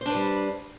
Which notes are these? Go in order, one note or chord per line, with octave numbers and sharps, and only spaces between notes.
G3 D4 B4 C5